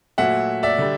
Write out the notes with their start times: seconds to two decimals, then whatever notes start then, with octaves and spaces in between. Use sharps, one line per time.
0.18 A#2 F#3 A3 E5 F#5
0.63 D5 E5
0.78 D3 G3